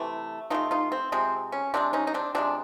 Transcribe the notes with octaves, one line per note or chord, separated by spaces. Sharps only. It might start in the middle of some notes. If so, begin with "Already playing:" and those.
Already playing: C3 E3 A3
C3 E3 A3 D#4 F4
D#4 F4
C4
C3 F3 G#3 C4
C#4
C3 F3 G#3 C4 D4
C#4 D#4
D#4
C4 D4
C3 F3 G#3 C4 D4